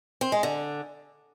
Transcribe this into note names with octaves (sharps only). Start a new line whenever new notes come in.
C4
G#3
D3